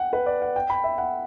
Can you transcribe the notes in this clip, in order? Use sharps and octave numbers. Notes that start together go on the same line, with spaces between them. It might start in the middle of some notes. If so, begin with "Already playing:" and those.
Already playing: F#5 G5
B4
D5
F#5
G5
B5
E5
F#5